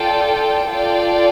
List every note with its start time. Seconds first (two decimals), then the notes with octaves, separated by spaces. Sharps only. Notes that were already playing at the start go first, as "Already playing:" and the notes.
Already playing: F4 A4 D5 G5
0.71 F4 A4 D5 G5